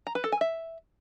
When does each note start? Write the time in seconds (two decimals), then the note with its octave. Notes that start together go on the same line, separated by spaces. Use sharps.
0.07 A#5
0.15 B4
0.24 A4
0.32 G#5
0.41 E5